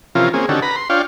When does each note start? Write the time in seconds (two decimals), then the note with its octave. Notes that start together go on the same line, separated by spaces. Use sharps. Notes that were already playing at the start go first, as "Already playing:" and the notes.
0.15 C3 E3 F3 C#4 F4 A#4
0.34 A#3 C4 C#4 G#4
0.49 D3 D#3 C#4 F#4 G4 A4
0.62 B4 A#5 B5
0.76 C6
0.90 D4 F4 C#5 F5 G5